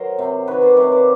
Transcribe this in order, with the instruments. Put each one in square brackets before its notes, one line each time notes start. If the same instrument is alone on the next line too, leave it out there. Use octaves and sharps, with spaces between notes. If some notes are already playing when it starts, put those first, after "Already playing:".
Already playing: [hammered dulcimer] F#3 A#4 C5
C3
D#3 B4 C#5
C5 D5
C3 B4 C#5
C5 D5